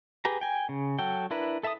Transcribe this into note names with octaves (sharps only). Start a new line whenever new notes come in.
G4 G#4 B4 A#5
G5 G#5
C#3
F#3 F#4 A4 G5
D4 E4 A#4 B4
A4 E5 A5 A#5 D#6